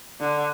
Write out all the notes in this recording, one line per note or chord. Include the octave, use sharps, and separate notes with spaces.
D3